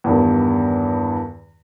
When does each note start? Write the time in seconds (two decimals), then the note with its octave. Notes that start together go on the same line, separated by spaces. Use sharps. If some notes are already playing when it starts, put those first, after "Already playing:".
0.04 E2 G2 D#3